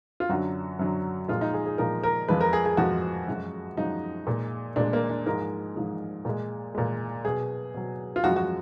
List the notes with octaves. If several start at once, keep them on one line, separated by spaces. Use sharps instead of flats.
F4
F#2 D3 F#3 F#4
F#2 D3 F#3
A#2 F3 G#3 F4
D#4
G#4
G#4
A#2 F3 G#3 A#4
A#4
F2 F3 G#3 B4
A#4
G#4
G#4
F2 F3 G#3 F#4
F#2 F3 G#3
F#2 F3 G#3 D#4
A#2 G#3
A#2 G#3 D4
A#3
D4
G#2 F3 G#3 A#4
G#2 F3 G#3
A#2 G#3
A#2 G#3
B2 F#3 G#4
B2 F#3
F4
F#2 F3 G#3 F#4
F#4